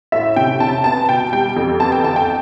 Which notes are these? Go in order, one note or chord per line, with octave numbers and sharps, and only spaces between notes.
A2 E5
C3 G5
C3 A5
B3 A5
B2 G5
G3 G5
F2
B3 A5
G5
F2 A5
G5